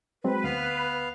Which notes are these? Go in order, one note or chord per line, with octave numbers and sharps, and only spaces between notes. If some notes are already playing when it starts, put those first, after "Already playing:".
F#3 G#3 C4 B4
D2 B3 F5